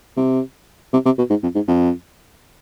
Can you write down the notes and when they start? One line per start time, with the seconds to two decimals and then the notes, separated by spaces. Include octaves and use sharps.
0.17 C3
0.93 C3
1.05 C3
1.18 B2
1.30 G#2
1.43 F2
1.55 G#2
1.68 F2